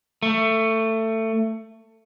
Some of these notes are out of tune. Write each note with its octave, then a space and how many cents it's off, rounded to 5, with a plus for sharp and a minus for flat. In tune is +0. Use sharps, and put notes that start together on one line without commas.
A3 +20